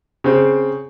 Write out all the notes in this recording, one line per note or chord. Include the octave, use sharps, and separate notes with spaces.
C#3 C4